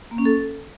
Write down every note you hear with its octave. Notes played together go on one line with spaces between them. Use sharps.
A#3
C#4
A4